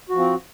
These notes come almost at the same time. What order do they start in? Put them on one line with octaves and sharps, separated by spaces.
F#4 F3 C4